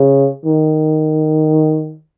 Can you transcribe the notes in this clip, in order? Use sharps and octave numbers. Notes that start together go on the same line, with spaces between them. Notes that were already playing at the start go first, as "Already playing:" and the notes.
Already playing: C#3
D#3